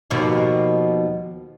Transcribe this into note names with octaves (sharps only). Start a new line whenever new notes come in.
D#2 B2 F3